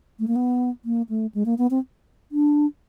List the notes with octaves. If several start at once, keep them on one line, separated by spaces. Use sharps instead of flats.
A3
A#3
B3
A#3
A3
G#3
A#3
B3
C4
D4